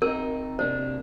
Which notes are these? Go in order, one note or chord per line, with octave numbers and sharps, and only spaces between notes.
C4 D#4 A#4
C3 A#3 D4 C5